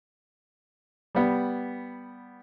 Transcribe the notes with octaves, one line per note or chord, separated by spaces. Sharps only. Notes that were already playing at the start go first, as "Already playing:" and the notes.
G3 B3